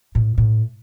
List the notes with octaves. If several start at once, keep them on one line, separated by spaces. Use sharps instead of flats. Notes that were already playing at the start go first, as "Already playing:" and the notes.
A2
A2